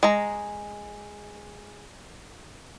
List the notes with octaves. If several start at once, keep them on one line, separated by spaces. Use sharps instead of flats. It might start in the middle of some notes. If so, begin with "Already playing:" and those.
G#3 A#5